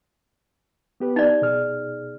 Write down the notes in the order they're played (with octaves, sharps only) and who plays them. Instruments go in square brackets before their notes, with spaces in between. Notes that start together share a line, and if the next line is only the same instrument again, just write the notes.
[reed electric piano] B3 G4 B4
[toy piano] D#4 D5
[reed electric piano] B2 G#4 F6